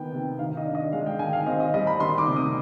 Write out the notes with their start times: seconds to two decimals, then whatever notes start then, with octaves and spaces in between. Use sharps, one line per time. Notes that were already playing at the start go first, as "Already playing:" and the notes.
Already playing: D#3 B3 G5
0.12 C3
0.39 D#3 F5
0.57 D#5
0.66 D4
0.75 D#5
0.92 G#3 F5
1.06 G5
1.19 D#3 G#5
1.33 F5
1.46 C4 D#5
1.60 D#5
1.74 G3 D#5
1.87 B5
2.00 D#3 C6
2.18 D6
2.27 C3
2.36 D#6